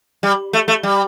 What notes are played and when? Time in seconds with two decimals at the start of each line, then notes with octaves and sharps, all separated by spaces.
0.23 G3
0.53 A3
0.68 A3
0.83 G3